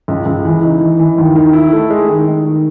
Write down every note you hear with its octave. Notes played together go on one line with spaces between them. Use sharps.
C#2
C#2
E3
D#4
E3
E3
D#2
D#3
E4
A3
G#3
D#3
D#3
D#3